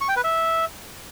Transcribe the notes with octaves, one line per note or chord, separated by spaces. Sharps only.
C#6
G5
B4
E5